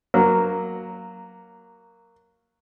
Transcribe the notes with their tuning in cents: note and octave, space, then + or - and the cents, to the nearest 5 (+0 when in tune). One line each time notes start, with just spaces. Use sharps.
F#3 +0 A#3 +0